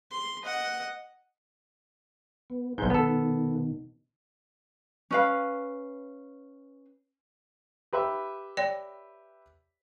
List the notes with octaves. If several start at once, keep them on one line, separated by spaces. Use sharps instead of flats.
C6
D#5 F#5
B3
B1 G#2 G6
B2 D#3 B3 A4
C#4 B4 F5
G4 B4 E5
C#5 D5 G5